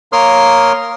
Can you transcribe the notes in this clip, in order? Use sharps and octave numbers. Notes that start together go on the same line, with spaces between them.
A#3 A#4 C#5 C6 D#6 F6